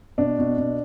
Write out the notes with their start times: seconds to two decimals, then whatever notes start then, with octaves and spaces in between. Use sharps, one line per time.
0.18 B2 D4
0.39 B2
0.58 B2